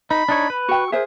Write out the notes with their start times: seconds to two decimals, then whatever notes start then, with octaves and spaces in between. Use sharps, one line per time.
0.11 D#4 B5
0.29 D4 D#4 C#5
0.50 B4
0.68 F#4 G5 C#6
0.92 G#4 A#4 C5 E5